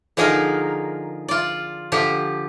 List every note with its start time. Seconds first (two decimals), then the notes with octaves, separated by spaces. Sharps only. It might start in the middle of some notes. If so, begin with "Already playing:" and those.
0.17 D3 F3 D#4 G#4 A#4
1.28 F4 D5
1.92 D3 F3 G4